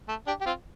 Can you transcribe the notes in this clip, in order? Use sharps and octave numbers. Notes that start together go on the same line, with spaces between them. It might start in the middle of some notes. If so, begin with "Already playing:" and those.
A3
D4 G4
G4
C4 F4